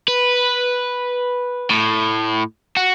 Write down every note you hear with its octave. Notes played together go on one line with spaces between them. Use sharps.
B4
A2
F#4